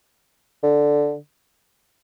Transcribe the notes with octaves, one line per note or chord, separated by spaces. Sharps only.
D3